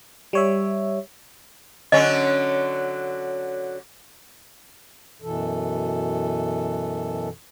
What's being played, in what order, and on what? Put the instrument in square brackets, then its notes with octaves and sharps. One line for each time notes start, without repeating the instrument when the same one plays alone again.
[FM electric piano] G3 C#5 E5
[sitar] D3 F#3 C#4 [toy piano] D#5
[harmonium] F#2 B2 E3 A4